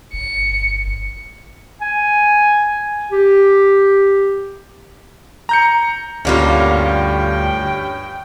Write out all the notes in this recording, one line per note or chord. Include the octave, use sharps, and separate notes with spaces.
G1 C#7
G#5
G4
A#5 G6 C#7
D2 G2 D3 G3 A#3 C#4 F4
G5